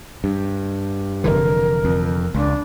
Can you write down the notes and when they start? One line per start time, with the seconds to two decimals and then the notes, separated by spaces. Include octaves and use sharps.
0.24 G2
1.24 F1 D3 E3 A#4
1.85 F2
2.35 C#2 D4